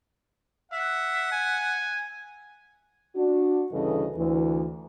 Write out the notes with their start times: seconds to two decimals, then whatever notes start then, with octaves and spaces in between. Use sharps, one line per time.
0.72 E5 F#5
1.32 G#5
3.16 D4 F#4
3.72 D2 G2 C#3 E3 A4 D#5
4.17 D2 E3